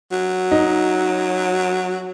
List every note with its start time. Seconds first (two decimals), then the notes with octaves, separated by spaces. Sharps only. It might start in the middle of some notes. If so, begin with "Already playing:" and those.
0.12 F#3
0.51 D#4